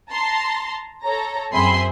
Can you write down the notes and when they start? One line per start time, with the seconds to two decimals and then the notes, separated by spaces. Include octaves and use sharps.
0.10 A5 A#5 C6
1.03 A4 C#5 A#5
1.53 F#2 C4 G#4 E5 B5 C6